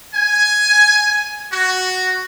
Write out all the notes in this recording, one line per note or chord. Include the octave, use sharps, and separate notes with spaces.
G#5
F#4